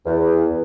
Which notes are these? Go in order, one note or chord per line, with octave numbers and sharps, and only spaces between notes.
E2